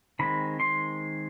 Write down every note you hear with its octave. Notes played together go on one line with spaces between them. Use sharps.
D#3 G#3 C4 B5
C6